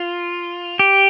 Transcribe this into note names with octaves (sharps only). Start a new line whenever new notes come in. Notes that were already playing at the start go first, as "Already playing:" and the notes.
Already playing: F4
G4